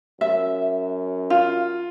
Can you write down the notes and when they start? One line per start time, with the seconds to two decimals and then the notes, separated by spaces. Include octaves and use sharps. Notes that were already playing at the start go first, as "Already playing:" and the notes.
0.21 F#2 E5
1.30 F4 F5